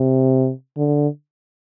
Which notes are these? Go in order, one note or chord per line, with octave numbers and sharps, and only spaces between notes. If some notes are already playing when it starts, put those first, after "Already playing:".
Already playing: C3
D3